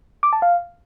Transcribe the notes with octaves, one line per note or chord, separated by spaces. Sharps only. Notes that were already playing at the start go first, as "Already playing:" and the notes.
D6
A5
F5